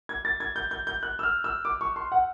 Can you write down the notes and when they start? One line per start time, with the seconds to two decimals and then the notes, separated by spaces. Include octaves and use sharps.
0.09 G#6
0.25 A6
0.40 G#6
0.56 G6
0.71 G6
0.87 G6
1.03 F#6
1.19 E6
1.23 F6
1.44 E6
1.65 D6
1.81 C#6
1.96 C6
2.12 F#5